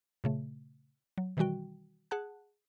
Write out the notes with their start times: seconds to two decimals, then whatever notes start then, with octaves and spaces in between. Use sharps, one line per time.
0.24 A#2 C#3 A3
1.18 F#3
1.37 B2 D#3 E3 G3 F#4 G5
2.11 G#4 F#5 A5 F#6